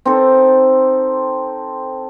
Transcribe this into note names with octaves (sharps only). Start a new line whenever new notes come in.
C4 D#4 A4